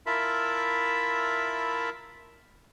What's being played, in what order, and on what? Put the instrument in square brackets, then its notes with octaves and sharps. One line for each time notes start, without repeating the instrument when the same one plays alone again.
[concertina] E4 F4 A#4 E5 A5 B5